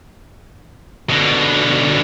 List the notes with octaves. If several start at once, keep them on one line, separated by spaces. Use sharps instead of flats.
B2 D3